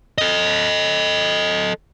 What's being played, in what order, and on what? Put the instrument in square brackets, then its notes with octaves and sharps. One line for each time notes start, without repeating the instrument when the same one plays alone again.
[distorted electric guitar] A4 D#5